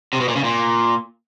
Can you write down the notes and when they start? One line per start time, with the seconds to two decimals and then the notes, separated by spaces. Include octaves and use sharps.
0.13 C3
0.20 B2
0.28 A#2
0.36 C#3
0.44 A#2